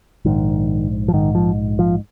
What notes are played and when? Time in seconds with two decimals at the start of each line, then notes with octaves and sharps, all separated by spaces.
0.25 A#1 G#2 D#3
1.08 F3
1.14 A#1 G#2 D#3
1.35 F3
1.79 F3